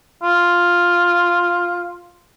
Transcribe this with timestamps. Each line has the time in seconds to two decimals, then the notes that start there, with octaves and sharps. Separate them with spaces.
0.23 F4